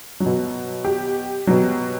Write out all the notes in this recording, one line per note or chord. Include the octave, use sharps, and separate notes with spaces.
F#3
B2
G4
B2 F#3